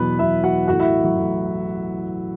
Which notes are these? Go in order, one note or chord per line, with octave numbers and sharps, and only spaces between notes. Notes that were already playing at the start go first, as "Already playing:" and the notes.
Already playing: E2 B2 F#3 B3 B4
E2 B2 F#3 E4 E5
F#4 F#5
A1 A2 A3 F#4 F#5
E4 E5
F#3 F#4
A1 A2 A3